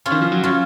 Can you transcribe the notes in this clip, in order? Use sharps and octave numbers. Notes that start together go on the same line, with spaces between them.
C#4 F4
D#3
F3
F#3
C#4 F4